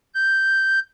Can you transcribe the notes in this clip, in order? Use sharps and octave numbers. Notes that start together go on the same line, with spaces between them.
G6